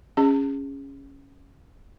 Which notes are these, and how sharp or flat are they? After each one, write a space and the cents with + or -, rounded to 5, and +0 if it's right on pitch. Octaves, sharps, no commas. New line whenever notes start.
C#4 -5 G#4 -20 A5 +40